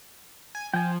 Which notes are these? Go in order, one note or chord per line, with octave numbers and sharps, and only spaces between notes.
G#5
F3 G5 G#5